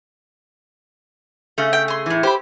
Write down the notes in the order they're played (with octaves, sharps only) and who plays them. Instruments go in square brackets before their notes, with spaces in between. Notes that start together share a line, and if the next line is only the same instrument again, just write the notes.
[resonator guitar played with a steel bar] C#3 A3
[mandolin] G5
G#4 C6
[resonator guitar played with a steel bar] A2 E3
[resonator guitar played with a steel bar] G4 [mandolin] C5 B5